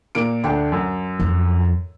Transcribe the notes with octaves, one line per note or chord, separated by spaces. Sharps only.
A#2 A#3 D7
D2 D4 G5
F#2
F2